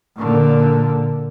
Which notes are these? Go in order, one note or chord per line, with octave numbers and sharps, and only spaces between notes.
A#2 D3